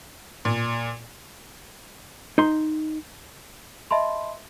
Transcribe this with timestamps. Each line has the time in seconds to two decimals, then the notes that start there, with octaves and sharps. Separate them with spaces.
0.45 A#2
2.38 D#4 C6
3.91 D#5 E5 A5 B5 C6